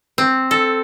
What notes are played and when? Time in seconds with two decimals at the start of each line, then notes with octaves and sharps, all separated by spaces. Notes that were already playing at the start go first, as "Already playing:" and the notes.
0.18 C4
0.51 A4